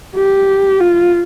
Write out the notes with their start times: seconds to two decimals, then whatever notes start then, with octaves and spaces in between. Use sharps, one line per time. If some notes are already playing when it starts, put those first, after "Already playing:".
0.15 G4
0.81 F4